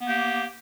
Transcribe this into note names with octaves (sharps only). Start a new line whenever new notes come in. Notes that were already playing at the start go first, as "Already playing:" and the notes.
A#3 B3 G4